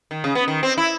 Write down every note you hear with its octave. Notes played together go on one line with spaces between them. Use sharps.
D#3
C#3
B3
D#3
C4
E4